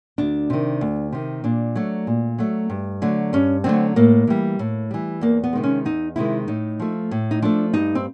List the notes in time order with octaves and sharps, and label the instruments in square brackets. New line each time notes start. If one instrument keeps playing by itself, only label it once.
[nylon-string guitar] D2 D4
C3 D#3
D2
C3 D#3
A#2 D4
F#3 A3
A#2
F#3 A3
G2
D3 F#3 A3
G2 C#4
D3 F#3 A3 C4
A2 A#3
E3 G3
A2
E3 G3
E2 A#3
B3
C3 D#3 G#3
C#4
E2 D#4
C3 D#3 G#3 E4
A2 D#4
F3 A3
A2
D#4
F3 A3 D4
G2 D#4
C4